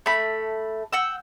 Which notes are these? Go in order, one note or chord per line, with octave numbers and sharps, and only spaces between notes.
A3 B5
F#5 G5 E6